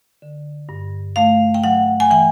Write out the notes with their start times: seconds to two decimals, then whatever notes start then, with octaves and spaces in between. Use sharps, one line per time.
0.22 D3
0.69 G2
1.16 A3 F5
1.54 G5
1.64 F#3 F#5
2.00 G#5
2.10 E3 G5